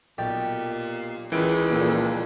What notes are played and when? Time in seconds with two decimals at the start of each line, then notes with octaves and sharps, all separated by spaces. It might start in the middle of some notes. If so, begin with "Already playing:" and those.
0.18 B1 A#2 G4 D5
1.32 C#2 D#3 E3 D7
1.70 F2 A#2 D3